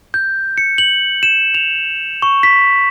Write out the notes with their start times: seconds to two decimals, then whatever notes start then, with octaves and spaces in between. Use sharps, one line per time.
0.14 G6
0.58 C#7
0.78 F#7
1.23 E7
1.54 F7
2.22 C#6
2.43 B6